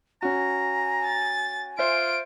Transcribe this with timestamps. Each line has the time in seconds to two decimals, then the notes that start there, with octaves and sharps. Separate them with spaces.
0.22 C#4 F#4 G#5 A#5
1.06 A6
1.79 F4 C5 E5 D7